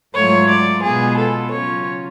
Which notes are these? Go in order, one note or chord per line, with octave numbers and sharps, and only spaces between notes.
G#2 F#3 A3 F4 C#5
D5
B2 G#3 B3 F4 G#4
A4
C#3 F#3 C#4 F4 C#5